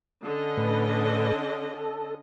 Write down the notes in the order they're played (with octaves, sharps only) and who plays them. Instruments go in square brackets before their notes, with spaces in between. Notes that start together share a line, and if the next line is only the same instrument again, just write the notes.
[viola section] D3 C#4 D#5
[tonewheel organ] A2 B4
A4